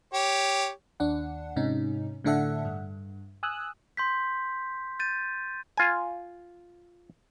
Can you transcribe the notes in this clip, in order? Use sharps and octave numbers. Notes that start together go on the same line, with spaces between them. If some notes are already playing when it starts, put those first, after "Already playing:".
G4 C#5
D#2 D4 F#5
G#2 C3 C#4 D#4
A2 D3 D4 A4 E5 F#5
G2
G#5 D#6 E6 F#6
C6 G6 B6
G6 A6 D#7
F4 G#5